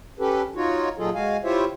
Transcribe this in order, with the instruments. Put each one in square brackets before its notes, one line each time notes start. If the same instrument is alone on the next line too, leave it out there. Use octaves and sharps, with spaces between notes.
[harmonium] C#4 G4 A4 B4
D#4 F4 F#4 C#5
A#2 F#3 D#4 F4 G#4 A4
G#3 F#4 F5 G#5
E4 F4 G4 C5 C#5 E5